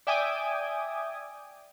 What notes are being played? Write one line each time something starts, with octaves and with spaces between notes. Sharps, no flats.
D5 E5 G5 G#5 D6 D#6